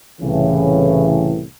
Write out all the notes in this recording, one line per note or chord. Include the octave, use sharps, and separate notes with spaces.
C2 A2 C#3 E3